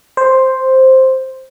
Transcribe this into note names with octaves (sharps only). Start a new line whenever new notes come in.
C5